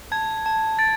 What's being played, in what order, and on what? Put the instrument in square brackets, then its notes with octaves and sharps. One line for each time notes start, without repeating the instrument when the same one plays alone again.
[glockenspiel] A5 [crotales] G#6
[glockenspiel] A5
[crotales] A6 [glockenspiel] D7